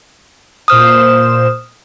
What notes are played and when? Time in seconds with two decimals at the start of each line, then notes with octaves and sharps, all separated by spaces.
0.68 A#2 C5 D#6 F6 E7